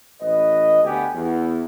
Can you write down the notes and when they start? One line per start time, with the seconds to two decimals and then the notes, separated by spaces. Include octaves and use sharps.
0.20 A1 B4 D#5
0.83 D2 B3 G4 G#5
1.13 E2